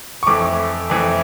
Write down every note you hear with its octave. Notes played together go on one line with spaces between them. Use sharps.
C#6
F2 E3 A3 E4 D6
F2 E3 A3 E4